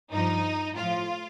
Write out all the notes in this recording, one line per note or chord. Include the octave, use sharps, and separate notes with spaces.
G2 F3 D#4
A2 F3 F4